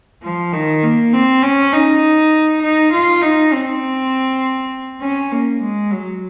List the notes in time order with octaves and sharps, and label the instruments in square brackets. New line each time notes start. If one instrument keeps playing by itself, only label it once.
[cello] F3
D#3
A#3
C4
C#4
D#4
D#4
F4
D#4
C4
C#4
A#3
G#3
F#3